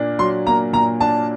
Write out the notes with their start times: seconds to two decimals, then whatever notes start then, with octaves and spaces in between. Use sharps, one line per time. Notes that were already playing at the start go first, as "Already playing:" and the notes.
Already playing: A#2 A#3 D4
0.19 F#3 C6
0.47 A#3 A#5
0.73 A#2 A#5
1.01 D4 A5